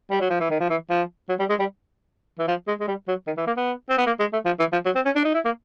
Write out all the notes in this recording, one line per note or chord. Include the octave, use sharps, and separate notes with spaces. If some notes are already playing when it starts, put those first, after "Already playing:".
G3
F#3
F3
E3
D#3
F3
E3
F3
F#3
G3
G#3
G3
E3
F3
G#3
G#3
G3
F#3
D#3
E3
A#3
B3
C4
B3
A#3
G#3
A3
F3
E3
F3
F#3
C4
C#4
D4
D#4
E4
A#3